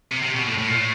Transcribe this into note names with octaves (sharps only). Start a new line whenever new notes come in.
C3
C3
B2
A2
A2
A#2
A2